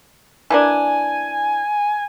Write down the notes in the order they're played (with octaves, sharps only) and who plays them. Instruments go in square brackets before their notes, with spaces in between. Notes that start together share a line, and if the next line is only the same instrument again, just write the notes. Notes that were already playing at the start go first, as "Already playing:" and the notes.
[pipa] E3 A#3 D4 [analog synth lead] G#5